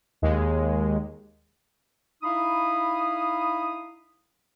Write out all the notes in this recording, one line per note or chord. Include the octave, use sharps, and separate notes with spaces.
D#2 G#3
D#4 E4 F5 B5 D#6